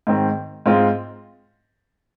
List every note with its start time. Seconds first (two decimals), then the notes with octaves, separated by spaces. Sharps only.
0.07 G#2 D#3 C4
0.66 G#2 G#3 C4 F4